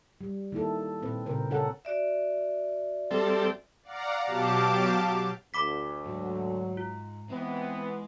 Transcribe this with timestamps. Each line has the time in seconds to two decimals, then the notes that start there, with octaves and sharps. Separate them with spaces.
0.21 G3
0.52 D#3 A#3 E4 A4
1.02 A#2 C4 B4
1.26 A#2 C#3 C4 A#4 C5
1.50 C#3 C#4 A4 A#4 F#5
1.85 F#4 D5 E5
3.11 G3 C4 A4
3.83 D5 F5 F#5 A#5
4.26 B2 F#3 G4 F5 A5 D6
5.54 D2 B5 D6 B6
6.06 G#2 F#3
6.77 F4
7.30 E3 G#3 B3 C4